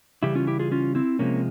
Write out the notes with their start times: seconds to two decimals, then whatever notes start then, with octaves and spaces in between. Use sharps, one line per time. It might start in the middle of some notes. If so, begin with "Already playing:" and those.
0.23 C#3 E3 G3 E4 G4
0.35 C#4 F4
0.47 E4 G4
0.59 F4 G#4
0.71 C#4 F4
0.95 C4 E4
1.19 C3 F3 G#3 A#3 C#4